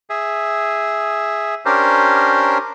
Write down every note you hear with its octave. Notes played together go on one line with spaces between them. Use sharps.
G#4 E5
C#4 D4 G4 A#4 C5